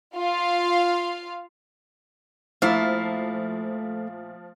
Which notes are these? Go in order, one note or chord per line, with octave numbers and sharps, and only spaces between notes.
F4 F5
A#2 F3 A3 E4 F5